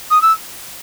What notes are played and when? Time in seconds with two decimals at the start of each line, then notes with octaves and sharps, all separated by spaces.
0.11 D#6
0.22 E6